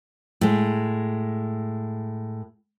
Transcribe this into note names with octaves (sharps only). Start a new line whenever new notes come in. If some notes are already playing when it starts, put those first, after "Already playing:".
A2 G#3